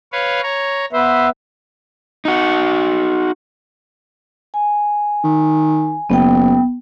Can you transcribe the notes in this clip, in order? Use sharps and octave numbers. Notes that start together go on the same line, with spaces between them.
B4 C#5 F5
C#5 A#5
B3 B4 C5 E5
D#4 F#4
G#5
D#3
F#1 B3 G5